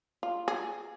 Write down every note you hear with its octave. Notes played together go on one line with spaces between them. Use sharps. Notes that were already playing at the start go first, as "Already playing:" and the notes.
F4
G#4